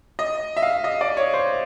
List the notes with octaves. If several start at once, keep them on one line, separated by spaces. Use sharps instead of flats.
D#5
E5
F5
D#5
D5
C#5
C5